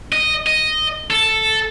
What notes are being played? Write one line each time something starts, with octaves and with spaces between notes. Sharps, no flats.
D#5
D#5
A4